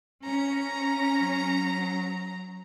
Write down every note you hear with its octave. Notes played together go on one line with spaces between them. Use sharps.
C#4 A#5
F#3